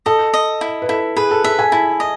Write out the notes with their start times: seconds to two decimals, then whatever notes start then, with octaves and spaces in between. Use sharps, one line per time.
0.06 A4 D#5
0.34 D#5
0.61 E4
0.82 B4
0.89 E4 A4
1.17 G#4 B4
1.31 A4
1.44 A4 E5
1.59 G#5
1.72 E4 A5
2.00 D#5